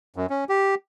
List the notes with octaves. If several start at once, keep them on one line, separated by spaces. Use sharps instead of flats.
F#2
C#4
G4